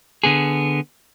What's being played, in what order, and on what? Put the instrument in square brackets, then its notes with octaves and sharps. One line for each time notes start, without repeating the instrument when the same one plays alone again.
[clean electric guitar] D3 B3 G#4